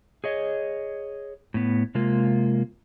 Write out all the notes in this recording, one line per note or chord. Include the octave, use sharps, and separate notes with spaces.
G#4 C#5 D#5
A2 B3
C3 G#3 A#3 F4